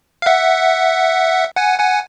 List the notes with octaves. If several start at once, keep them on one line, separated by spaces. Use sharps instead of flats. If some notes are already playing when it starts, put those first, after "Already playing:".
F5
E5 F#5
F#5 G#5
F#5 G#5